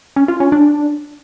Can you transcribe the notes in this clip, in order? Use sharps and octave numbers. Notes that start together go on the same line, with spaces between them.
C#4
F4
C#4
D4